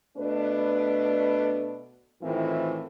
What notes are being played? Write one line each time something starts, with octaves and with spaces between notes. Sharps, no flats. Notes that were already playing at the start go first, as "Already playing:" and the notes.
B2 A3 D4 B4
A2 D#3 E3 C4 E4 F4